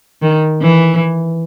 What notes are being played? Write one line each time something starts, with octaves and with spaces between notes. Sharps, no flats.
D#3
E3